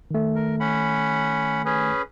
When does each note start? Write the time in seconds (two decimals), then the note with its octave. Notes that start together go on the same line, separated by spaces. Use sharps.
0.11 D#3 A3
0.36 A#4
0.60 C#4 F#5 B5
1.66 C#4 G#4 B4